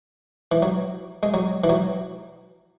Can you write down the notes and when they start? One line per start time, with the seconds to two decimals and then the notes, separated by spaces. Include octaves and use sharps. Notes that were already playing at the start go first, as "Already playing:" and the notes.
0.52 E3
0.62 F#3
1.23 G#3
1.34 F#3
1.64 E3
1.69 F#3